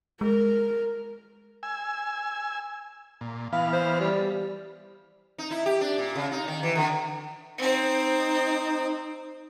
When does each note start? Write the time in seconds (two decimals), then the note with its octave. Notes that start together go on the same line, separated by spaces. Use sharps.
0.21 G#3 A#4
1.63 G#5 E6
3.21 A#2
3.53 E3 B3 F5 F6
3.73 C5
4.00 G3
5.38 D#4
5.51 E4
5.66 G4
5.81 D4
5.98 A#2
6.16 C#3
6.32 D#4
6.48 D#3
6.63 E3
6.75 D3
7.58 C4 D#4 C5